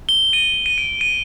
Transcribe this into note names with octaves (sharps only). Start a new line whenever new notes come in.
G7
D#7
D#7
D7
D#7